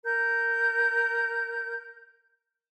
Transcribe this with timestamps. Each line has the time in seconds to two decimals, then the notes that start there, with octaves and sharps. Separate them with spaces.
0.05 A#4 G6